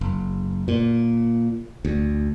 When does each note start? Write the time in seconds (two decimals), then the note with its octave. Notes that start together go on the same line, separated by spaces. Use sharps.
0.01 F#1
0.68 A#2
1.85 D2